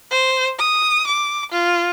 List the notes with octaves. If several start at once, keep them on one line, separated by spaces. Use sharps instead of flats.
C5
D#6
D6
F4